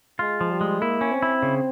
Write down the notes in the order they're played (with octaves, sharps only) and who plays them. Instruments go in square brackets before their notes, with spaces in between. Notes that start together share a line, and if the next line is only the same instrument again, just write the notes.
[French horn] G#3 [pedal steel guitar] F4
[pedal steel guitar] F3
[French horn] G3
[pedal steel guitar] G#3
[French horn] A#3 [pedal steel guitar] E4
[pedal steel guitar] C#4
[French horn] C4
[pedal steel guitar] E4
C#3